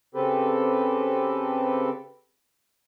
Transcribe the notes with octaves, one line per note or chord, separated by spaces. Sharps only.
C#3 C4 G4 A4 B4